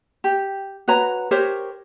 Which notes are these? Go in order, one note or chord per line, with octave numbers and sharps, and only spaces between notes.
G4
F#4 B4 C#5 A#5
G4 A#4 C5 C#5